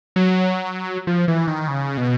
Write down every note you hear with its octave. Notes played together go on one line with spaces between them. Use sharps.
F#3
F3
E3
D#3
C#3
B2